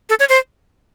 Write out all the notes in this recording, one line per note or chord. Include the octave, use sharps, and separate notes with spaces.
A4
C#5
C5